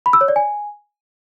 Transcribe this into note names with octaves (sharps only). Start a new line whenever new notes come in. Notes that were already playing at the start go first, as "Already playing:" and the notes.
B5
E6
C#5
D5
G#5